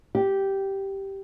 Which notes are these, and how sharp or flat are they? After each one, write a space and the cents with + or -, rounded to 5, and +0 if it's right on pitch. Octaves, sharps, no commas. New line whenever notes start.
G4 -5